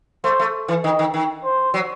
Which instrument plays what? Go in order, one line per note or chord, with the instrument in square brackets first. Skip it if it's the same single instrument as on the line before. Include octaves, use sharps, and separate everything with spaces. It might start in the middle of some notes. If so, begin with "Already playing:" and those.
[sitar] A3 [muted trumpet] C5
[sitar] A3
E3
[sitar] D#3 [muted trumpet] D#5
[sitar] D#3
D#3
[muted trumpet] C5
[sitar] F#3